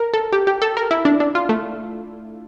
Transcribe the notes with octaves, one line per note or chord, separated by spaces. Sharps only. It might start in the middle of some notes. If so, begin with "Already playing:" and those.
Already playing: A#4
A4
G4
G4
A4
A#4
E4
D4
D4
F4
A3